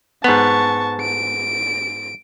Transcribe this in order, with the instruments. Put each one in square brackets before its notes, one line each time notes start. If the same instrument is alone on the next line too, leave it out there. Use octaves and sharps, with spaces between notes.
[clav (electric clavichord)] G#2 B3 [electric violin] A5 C#6
[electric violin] D7